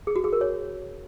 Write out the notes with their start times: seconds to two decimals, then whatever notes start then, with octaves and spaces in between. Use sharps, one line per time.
0.07 G#4
0.16 F#4
0.24 G#4
0.33 A#4
0.41 C#5